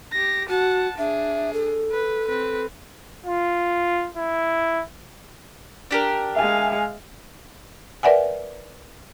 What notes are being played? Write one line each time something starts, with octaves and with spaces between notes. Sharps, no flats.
G4 A#6
F#4 F#5 A5
D4 G#4 E5
A4
B4
C4 B4
F4
E4
D4 G4 A#4
G#3 E5 F5 G#5
A#4 B4 D5 E5 F#5 G#5